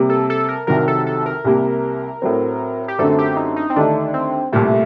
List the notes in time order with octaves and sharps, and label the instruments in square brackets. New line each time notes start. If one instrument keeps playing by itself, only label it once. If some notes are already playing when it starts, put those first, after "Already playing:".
Already playing: [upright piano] C3 G3 A#3
[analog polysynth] A4
A4
A#4
[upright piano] C2 C3 D#3 F#3 [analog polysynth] A#4
[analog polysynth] A4
A4
A#4
[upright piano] C2 C3 G3 A#3
A2 F#3 C4
[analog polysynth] G4
[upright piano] F#2 D3 F#3 A3 C4 [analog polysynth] A4
[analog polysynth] G4
D#4
D#4
C4
[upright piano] D#2 D3 A3 D#4 [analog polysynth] D4
[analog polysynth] C4
[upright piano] C2 A#2 G3 [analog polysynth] A3